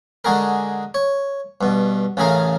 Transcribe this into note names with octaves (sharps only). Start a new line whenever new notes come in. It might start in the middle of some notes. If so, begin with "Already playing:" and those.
D3 G#3 F#4 G#4 A#4
C#5
G2 B2
A1 C#3 A3 G#4 A#4 F5